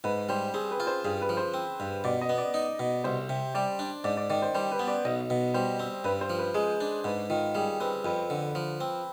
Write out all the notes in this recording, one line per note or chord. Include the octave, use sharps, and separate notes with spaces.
G#2 B4
G3 C5
C4 G#4
B4
F4
C5
G2 G#4
B4
F3
C5
C4
G2
B2 D5
D#5
B3
D5
D#4
B2
C2 C5
C3
G3 D5
D4
G#2 D5
D5
D#3 D5
C5
G3 C5
B4
B3
D5
B1 D#5
B2
G3 C5
C4
G2 B4
C5
F3
B4
G#3 G#4
D4
G#2 B4
D#3 F4
G3 G#4
C4 B4
F2 B4
D3
F3
C4